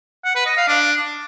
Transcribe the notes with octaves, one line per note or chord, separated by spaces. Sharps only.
F#5
B4
D#5
F5
D4